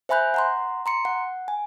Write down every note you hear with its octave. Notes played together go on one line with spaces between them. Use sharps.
C5 E5 G#5 B5 F#6 G6
F#5 A#5 C6
A#5 C6 C#7
F#5
G#5